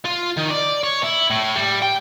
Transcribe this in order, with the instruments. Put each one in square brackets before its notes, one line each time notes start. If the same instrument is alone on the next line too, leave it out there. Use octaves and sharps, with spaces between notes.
[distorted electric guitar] F4
D#3
D5
C#5
E4
A2
G3
G5